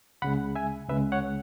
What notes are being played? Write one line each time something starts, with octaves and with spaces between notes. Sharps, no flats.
C#2 C#3 G#3 F#5 B5
E5 G#5
C#2 C#3 G#3 B4 E5
C#5 F#5